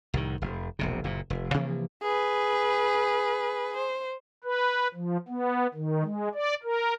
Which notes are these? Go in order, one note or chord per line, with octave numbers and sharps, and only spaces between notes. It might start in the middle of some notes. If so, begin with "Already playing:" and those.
C2 A2 D#3
F1
E1 A#1 C3
F#1 A#2
F1
C3 E3 F3 A#3
G#4 B4
C5
B4
F3
B3
D#3
G#3
D5
A#4